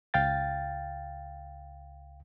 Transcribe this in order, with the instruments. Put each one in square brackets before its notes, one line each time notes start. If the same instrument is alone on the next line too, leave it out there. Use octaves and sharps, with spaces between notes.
[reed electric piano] C#2 F5 G5 A6